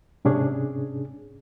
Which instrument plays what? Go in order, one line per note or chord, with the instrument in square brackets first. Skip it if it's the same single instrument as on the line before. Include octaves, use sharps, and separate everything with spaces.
[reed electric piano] G#2 C3 C#4 D4 G#4